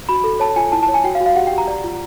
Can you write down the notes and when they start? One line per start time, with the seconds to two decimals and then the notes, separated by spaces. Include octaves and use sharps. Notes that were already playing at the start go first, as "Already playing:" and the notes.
0.09 F#4 B5
0.24 A4
0.40 C#5 A5
0.56 F4 G#5
0.72 E4 A5
0.83 A5
0.88 C#5
0.94 G#5
1.04 F#4 G5
1.15 F5
1.20 F#4
1.26 F5
1.36 G4 F#5
1.47 G5
1.53 G4
1.58 A#5
1.68 D5
1.84 F4